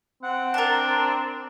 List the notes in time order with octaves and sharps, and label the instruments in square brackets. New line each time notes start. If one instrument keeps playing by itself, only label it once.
[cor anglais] C4 [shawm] F#5
[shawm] D4 [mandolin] A#4 A5